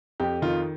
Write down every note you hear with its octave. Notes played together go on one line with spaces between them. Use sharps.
F2 G4
D#3 F4